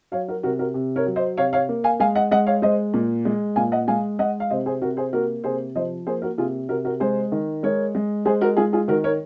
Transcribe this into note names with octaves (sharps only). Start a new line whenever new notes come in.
F#3 C#5 F5
F#4 A#4
C3 F#4 A#4
F#4 A#4
C3
A#4 C#5
F#3
C5 D#5
C3 C#5 F5
C#5 F5
A#3
F5 G#5
G#3 F5 G#5
D#5 F#5
G#3 D#5 F#5
C#5 F5
G#3 C5 D#5
A#2
G#3
A#2 F5 G#5
D#5 F#5
G#3 F5 G#5
G#3 D#5 F#5
F5
C3 C5 D#5
G#4 C5
C3 F#4 A#4
G#4 C5
A#3 F#4 A#4
C3 G#4 C5
F3 C5 D#5
A#3 G#4 C5
F#4 A#4
C3 F4 G#4
C3 F#4 A#4
F#4 A#4
G#3 G#4 C5
D#3
G#3 A#4 C#5
G#3
G#3 G#4 C5
F#4 A#4
G#3 F4 G#4
F4 G#4
D#3 F#4 A#4
A#4 C#5